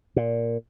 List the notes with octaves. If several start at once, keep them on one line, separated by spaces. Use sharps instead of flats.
A#2